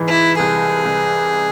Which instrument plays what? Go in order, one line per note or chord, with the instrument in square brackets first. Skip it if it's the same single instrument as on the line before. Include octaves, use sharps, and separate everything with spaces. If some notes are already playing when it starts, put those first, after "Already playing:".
Already playing: [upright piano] G#2 E3
[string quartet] E4
[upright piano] C2 [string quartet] G#4
[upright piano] C2